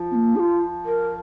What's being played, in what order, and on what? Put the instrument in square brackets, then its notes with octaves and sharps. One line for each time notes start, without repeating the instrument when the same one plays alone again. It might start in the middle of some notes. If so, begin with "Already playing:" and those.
Already playing: [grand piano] F3
[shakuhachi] C4
A#3
G#4
F4
A#4